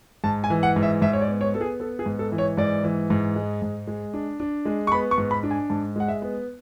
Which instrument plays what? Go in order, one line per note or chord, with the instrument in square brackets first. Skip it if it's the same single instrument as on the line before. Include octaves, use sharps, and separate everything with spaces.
[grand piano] G#2 A5
G#5
E3
F#5
G#2
E5
G#2 E5
C#5
D5
B3
C#5
B3 A4
G#4
B3 A4
G#4
G#2
A4
E3
C#5
G#2 D5
E3
G#2
G#3
G#2
G#3
D4
D4
G#3
C#6
B3 B5
C#6
G#2
B5
D4
G#5
G#2 A5
G#3 F#5
E5
B3